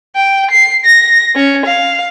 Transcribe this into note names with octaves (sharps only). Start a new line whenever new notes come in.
G5
C7
A#6
C#4
F5